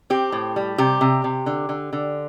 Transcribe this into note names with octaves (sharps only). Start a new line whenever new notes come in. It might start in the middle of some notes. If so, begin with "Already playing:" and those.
C4 G4
A2
G3
C3 G4
C3
C3
D3
D3
D3